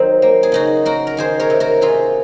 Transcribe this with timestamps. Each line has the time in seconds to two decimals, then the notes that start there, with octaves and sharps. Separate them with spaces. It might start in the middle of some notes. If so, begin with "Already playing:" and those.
Already playing: D#3 F#3 C4 D#4
0.22 A#3
0.43 G#4
0.52 C#3 D#4 F#4
0.85 A#3 F#4 A#4
1.07 A#4
1.17 D#3 G#4 C5
1.39 A#4 C#5
1.50 C3
1.60 F#4 A#4
1.81 C3 F4 G#4